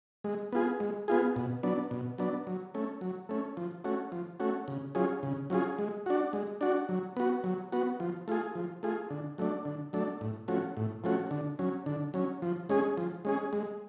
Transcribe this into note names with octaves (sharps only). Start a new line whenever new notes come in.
G#3
B3 F4 G#4
G#3
B3 F4 G#4
B2
F#3 B3 D4
B2
F#3 B3 D4
F#3
A3 C#4
F#3
A3 C#4
F3
A3 C#4 F#4
F3
A3 C#4 F#4
C#3
F#3 C#4 F4 G#4
C#3
F#3 C#4 F4 G#4
G#3
D4 F#4
G#3
D4 F#4
F#3
B3 F#4
F#3
B3 F#4
F3
A3 F4 G#4
F3
A3 F4 G#4
D3
F#3 A3 D4
D3
F#3 A3 D4
A2
F3 A3 C#4 F#4
A2
F3 A3 C#4 F#4
D3
F#3 C#4
D3
F#3 C#4
F3
G#3 C#4 G#4
F3
G#3 C#4 G#4
G#3